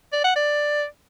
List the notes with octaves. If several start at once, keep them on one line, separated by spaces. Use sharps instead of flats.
D5
F#5
D5